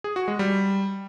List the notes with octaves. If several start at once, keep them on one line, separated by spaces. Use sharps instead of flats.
G#4
F#4
G#3
G3